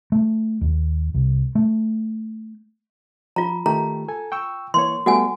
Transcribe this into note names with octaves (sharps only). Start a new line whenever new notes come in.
A3
D#2
C2
A3
F3 F4 A#5
D#3 A3 G4 A#5
A4 G#5
G5 C#6 E6
E3 A#3 C#5 C6
G3 A3 B3 F#4 F#5 G#5